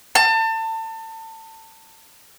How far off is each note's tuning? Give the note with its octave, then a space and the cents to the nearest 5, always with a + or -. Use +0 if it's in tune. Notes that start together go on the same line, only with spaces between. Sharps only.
A5 +30